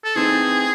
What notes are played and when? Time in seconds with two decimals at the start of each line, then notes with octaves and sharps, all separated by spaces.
0.04 A4
0.15 E3 A3 C4 D#4 G#4